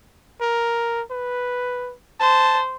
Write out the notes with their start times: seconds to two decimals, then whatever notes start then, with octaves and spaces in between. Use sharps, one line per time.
0.41 A#4
1.11 B4
2.20 C5 A5